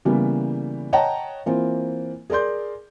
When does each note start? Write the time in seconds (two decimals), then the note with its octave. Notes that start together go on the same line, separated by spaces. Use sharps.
0.05 C#3 E3 G3 A#3 B3
0.93 C#5 D#5 F#5 G5 A5 A#5
1.46 E3 A#3 C4 F4
2.30 G#4 A#4 D5 C6 G6